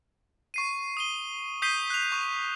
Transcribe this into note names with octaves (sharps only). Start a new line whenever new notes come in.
C#6 C7 D#7
D#6 D#7 G7
D#6 G6 B6 C7 D#7 G7
F#6 F7
C#6